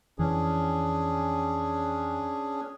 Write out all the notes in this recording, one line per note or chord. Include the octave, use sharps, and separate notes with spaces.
F2 E3 C#4 D4 G#4